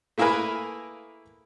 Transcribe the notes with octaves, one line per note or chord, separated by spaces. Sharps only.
A3 A#3 E4 G#4 A#4 B4